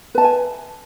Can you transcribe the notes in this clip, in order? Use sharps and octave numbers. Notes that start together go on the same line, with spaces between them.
B4 E5 G#5 A5